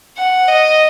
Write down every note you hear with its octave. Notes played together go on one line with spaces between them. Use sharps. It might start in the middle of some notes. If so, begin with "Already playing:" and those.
F#5
D#5